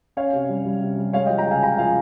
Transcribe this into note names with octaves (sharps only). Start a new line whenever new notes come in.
C#4 C#5 F5
C3
G3
G3
C3
G3
G#3 C#5 F5
D#5 G5
F3
G5 A#5
C#3 F5 G#5
G#3 G5 A#5
F3 F5 G#5